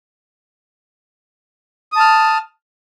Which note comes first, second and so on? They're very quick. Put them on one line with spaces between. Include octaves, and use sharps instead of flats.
D#6 A5 F6